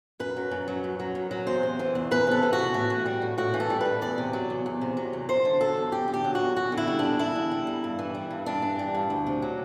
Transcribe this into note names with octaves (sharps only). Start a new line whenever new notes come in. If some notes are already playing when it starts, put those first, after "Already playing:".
F#2 B4
F#3
F#2
F#3
F#2
F#3
F#2
F#3
E2 C5
C3
E3
E2
E2 B4
C3 A4
E3
F#4
E2
A2
E3
G3
A2
A2 F#4
E3
A4
G3
A2 B4
E2 D5
C3
F#3
E2
E2
C3
F#3
E2
E2 C5
D3
F#3 A4
E2
E2 G4
D3
G4
F#3
E2 F#4
E2 F#4
D3
E4
G3
E2 D4
E2 E4
D3
G3
E2
G2
E3
G3
G2
G2 D4
E3
G3
G2
D2
C3
F#3